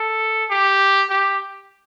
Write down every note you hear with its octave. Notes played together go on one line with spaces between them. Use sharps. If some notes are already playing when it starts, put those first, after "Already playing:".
Already playing: A4
G4
G4